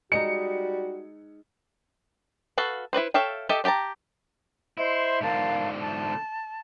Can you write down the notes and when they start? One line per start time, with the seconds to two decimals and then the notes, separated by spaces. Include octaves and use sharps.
0.12 G3 G#3 D#4 F#4 C#7
2.58 F#4 A4 B4 F5
2.93 E4 F#4 B4 C5
3.14 A4 C#5 E5 F5 G5
3.49 G4 A4 D#5 E5
3.64 D4 G4 G5 A5 A#5
4.78 E4 C5 D#5 C6
5.21 G#2 D3 A#4 F5 A5
5.80 A5